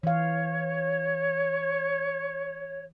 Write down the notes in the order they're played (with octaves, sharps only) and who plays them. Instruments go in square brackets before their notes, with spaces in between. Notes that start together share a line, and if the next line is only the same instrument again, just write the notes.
[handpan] E3 F5 [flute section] C#5